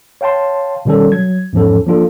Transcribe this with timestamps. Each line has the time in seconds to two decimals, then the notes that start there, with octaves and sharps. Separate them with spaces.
0.21 C#5 F5 G5 A5 C6
0.85 B2 D#3 G3 C#4 A4
1.12 F#3 G#6
1.53 E2 G#2 F3 C#4 A4
1.86 F3 A#3 D4 F4 A4